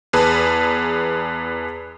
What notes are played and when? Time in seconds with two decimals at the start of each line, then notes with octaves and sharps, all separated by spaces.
0.13 E2 G#4 B4 A5